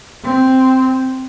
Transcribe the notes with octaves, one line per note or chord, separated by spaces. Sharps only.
C4